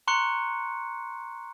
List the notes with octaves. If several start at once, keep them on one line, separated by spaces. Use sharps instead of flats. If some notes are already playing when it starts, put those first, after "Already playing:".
A#5 C6 C#6 F#6 C#7